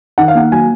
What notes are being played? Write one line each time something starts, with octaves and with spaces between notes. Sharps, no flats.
D#3 F#5
F5
A#3 F#5
F#3 G#5